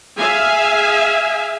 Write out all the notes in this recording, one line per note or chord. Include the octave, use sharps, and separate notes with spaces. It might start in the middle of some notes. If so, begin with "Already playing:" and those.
G#4 E5 F5 G#5